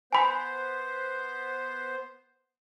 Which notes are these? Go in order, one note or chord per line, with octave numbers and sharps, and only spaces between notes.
B3 C5 G#5 B5